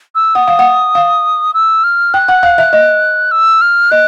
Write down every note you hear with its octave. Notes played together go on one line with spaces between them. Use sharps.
E6
F#5 D#6
F5
F#5
F5
E6
F6
G5 F#6
F#5
F5
E5
D#5
E6
F6
D#5 F#6